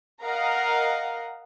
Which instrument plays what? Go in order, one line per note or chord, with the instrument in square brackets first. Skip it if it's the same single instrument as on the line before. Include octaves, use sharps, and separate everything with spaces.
[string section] A#4 D#5 F5 F#5 A#5